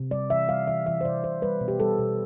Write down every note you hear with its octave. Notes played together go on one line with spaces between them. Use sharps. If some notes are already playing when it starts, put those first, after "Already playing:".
Already playing: C3
G3 D5
E3 E5
G3 F5
E3 E5
E3 E5
C5
C3 D5
C3 C5
G3 B4
B2
G4
G3 A4
B2